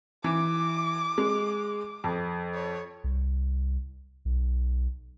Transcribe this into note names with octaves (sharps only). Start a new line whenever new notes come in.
E3 D6
G#3
F2
C#5
C2
B1